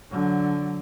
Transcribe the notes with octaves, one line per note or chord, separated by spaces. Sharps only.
D3 F#3